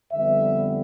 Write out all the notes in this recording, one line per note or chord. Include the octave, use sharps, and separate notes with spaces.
F2 D3 G3 B3 E5